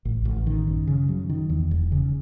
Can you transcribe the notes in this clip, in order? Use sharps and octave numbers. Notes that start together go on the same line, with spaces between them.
A1
A1
D#3
F#2
C#3
F#3
D#3
E2
E1
C#3